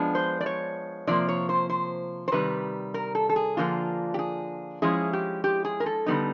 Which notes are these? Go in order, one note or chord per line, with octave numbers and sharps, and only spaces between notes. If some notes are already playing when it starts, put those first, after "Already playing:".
Already playing: F3 G#3 B3 D4
C5
D5
C#5
C3 F3 A#3 D5
C#5
C5
C5
C5
C3 D#3 G3 B4
A#4
A4
A4
G#4
D3 F3 A#3 D4 F4
G4
G#4
F3 G#3 C#4 E4 G#4
G4
G4
G#4
A#4
A4
D3 G3 B3 D#4